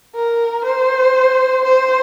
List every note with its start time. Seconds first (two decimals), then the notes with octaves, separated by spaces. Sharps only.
0.15 A#4
0.65 C5
1.65 C5